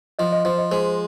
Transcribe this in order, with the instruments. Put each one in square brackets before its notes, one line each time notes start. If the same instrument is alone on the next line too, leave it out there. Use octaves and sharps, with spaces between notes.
[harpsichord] F3 [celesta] D#5
[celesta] D#5
[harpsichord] F3 [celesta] C5
[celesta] D#5
[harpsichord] G#3 [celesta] C5